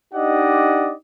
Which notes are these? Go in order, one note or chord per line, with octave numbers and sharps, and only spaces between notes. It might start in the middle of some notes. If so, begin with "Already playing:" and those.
D4 D#4 G4 D5 D#5 F#5